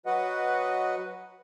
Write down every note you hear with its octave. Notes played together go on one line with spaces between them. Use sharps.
F#3 F#4 B4 D#5 F#5